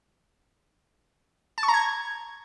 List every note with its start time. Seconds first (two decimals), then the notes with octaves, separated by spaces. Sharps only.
1.58 A5
1.63 C#6
1.68 A#5
1.74 G#6